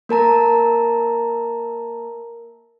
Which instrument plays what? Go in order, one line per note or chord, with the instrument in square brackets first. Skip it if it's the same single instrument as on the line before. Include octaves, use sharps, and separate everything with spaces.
[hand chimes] A#3 A#4 A5 A#5